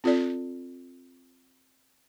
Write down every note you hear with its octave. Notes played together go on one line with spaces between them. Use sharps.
C4 F4 A4 D5